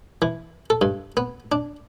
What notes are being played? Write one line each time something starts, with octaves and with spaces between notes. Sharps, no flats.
E3
A4
G2
B3
D4